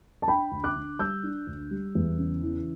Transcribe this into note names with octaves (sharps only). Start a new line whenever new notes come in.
A5
D4 G5 B5
D2
D6 F#6
D3
G3 E6 G6
D4
D2
G3
E2
C#3
E3